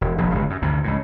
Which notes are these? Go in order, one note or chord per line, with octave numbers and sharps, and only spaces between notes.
E1
F1 A#1 F2
G1 C#2
F#2
D2 G2 C3
C#2 A2